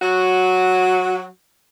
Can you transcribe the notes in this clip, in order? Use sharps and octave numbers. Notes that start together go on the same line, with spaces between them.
F#3 F#4